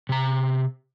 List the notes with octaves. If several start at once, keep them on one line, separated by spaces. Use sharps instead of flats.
C3 A#5